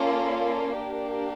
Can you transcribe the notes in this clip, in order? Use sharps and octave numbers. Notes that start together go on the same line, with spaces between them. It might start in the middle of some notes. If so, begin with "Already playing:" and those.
Already playing: A#3 C#4 F4 A4 D5
A#3 D4 G4 A#4